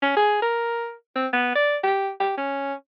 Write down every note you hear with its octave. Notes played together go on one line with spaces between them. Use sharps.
C#4
G#4
A#4
C4
B3
D5
G4
G4
C#4